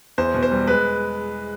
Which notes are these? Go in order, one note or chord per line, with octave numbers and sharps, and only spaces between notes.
E2 C5
B2
C5
G3
G#3 B4